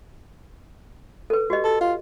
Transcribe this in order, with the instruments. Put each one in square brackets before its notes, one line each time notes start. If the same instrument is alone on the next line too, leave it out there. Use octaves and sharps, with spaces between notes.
[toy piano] A4 B4
F#4 G4 D#5
[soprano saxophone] A4
F4